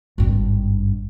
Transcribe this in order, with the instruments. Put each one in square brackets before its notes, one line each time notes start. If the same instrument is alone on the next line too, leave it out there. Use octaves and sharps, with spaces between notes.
[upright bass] G#1 G2